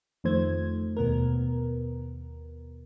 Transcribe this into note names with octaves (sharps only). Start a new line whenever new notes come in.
F2 D#3 F3 A3 C5 G#6
D#2 B2 B3 A#4